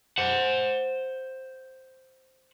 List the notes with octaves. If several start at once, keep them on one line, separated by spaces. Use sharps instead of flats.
C5 F#5